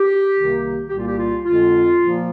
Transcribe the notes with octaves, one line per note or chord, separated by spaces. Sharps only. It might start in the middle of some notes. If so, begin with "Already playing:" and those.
Already playing: G4
C2 C3 D#3 A#3
C2 A#2 G3 A#3 G4
F4
G4
F4
F2 D3 G#3 F4
A#2 F3 A#3